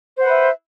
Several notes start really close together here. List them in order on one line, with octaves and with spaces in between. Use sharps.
C5 F#5 B4 E5